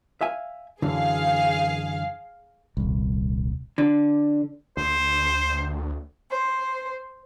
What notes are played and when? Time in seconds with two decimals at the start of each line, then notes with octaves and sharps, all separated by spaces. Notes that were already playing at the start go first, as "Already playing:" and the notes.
0.21 E5 F5 G#5
0.82 F#2 D3 E3 G#4 F5
2.77 D#1 C2
3.78 D3
4.77 D2 C5
6.30 C5